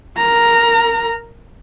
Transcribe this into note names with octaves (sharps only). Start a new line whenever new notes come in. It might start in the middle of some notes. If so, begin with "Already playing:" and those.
A#4 A#5